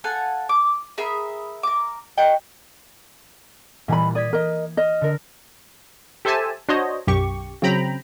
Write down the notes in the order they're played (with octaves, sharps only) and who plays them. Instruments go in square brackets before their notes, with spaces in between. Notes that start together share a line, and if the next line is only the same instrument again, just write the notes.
[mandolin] A4 F5 F#5 G#5
D6
G#4 A#4 E5 B5
A#4 D6
F#4 D#5 G5
[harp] A#2 E3 G3 [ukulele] D#5 G#5 B5
[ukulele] D5 [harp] D#6 G#6 B6
[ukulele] A#4 D#5
[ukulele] D#5 [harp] F6
[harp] D3 A#4
[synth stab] G4 A4 C5 E5 G#5 A5
D4 F#4 C5 C#5 D#5
B1 F#2 G4 C#6
C#3 F#3 C4 G5 A#5 B5